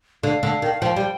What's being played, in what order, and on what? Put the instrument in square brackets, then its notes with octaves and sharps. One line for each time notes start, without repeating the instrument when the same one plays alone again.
[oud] D3 [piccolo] F5
[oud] D3
D#3
[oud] F3 [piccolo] G5
[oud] G3